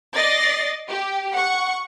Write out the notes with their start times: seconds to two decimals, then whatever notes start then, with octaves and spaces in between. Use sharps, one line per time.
0.14 D5 D#5 A6 A#6 C7
0.89 G4
1.32 F#5 C#6